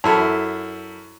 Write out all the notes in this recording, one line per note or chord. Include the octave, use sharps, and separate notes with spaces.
F#2 E4 A4